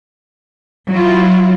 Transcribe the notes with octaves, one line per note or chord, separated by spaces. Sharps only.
F#3 E4 F4